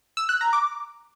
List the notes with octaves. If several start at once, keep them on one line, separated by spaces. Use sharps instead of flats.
E6
F#6
A#5
D6